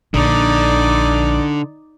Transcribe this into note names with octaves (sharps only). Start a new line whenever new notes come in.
A#1 D3 D#4 D5